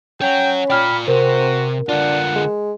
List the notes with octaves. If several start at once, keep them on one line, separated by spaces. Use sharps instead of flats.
C#4 C#5 F#5 G5
F4 D5 G5 B5 F6
C3 C4 F#4 A#4
D3 D4 F4 F#5
G#3